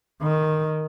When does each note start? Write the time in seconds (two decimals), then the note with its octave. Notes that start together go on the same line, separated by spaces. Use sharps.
0.22 D#3